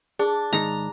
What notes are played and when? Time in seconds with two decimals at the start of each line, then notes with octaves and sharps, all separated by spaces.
0.19 D4 G#4
0.53 G#2 D#3 A#5